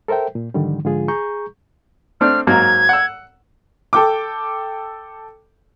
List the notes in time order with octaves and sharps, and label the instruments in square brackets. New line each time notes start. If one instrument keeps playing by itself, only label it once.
[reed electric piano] A4 A#4 C5 E5 G5
A#2
G#2 D3 D#3 F3 G3
G#2 D3 F3 G#3 F4 G#4
G#4 A#5 C#6 G6
[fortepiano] A3 C4 D4 [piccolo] F6
[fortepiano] G#2 F#3 A#3 [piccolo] G#6
[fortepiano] F#5 E6
[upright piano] A4 G5 D6